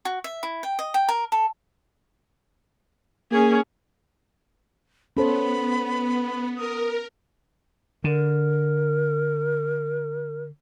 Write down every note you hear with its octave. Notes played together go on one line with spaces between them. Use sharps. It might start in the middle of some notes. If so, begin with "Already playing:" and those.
F#4
E5
E4
G5
D#5
G5
A#4
A4
A#3 C#4 G#4
B3 C#4 A4 C5 B5
A#4 D#6
D3 A#4